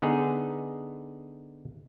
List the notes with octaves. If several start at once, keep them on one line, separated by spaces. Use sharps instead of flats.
D3 B3 D#4 G#4